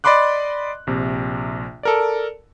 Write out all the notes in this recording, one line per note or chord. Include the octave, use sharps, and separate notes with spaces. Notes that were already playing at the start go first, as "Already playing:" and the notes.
D5 D#5 B5 C6 D6 F#6
A#1 C3
A4 A#4 D5